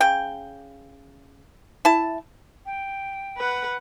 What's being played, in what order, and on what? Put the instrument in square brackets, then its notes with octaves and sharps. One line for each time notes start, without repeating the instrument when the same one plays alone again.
[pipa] C#3 G5
E4 A5
[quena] G5
[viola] B4 F#5